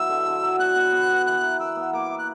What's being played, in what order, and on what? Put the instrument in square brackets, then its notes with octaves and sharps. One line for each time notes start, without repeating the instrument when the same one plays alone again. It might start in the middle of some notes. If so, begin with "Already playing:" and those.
Already playing: [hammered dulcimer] B2 F#3 E4 [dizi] E6
[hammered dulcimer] D3
D3
F#3
[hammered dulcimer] B3 [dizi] F#6
[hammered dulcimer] B3
B3
B3
[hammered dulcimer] E3 [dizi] F#6
[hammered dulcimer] A#4
[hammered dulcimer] A#4 [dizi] E6
[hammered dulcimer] B3
[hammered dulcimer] A#3 [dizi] D6
[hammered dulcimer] E4
[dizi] F#6